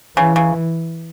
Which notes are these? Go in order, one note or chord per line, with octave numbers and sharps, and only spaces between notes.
C#3 E3
C#3